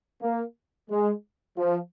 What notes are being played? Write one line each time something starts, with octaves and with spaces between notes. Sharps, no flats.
A#3
G#3
F3